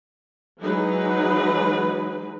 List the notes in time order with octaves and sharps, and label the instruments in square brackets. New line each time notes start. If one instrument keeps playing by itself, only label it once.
[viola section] E3 F#3 G#3 D#4 B4